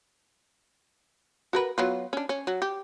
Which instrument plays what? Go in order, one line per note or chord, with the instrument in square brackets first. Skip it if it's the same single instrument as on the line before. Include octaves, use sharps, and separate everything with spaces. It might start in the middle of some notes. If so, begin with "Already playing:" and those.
[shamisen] F#4 A#4 B4
F#3 B3 F4
C#4 D4
C#4
F#3
G4